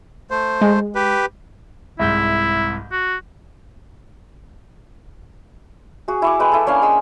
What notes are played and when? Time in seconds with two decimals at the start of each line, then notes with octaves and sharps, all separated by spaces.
0.31 A3 C5
0.62 G#3
0.95 G4 B4
1.99 C2 G#2 E4 G6
2.92 F#4
6.08 F#4 G#4
6.22 E4 C#6 D6
6.40 G#3 B4 G5
6.52 E4 A4
6.66 A#3 C#4 D4 F5
6.82 G#3 E6